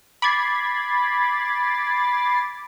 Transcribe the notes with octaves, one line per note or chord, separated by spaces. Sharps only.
B5 D6 G#6 A6 C7